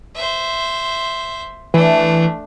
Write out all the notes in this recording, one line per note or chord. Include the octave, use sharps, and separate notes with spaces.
C5 E5
E3 A3 D4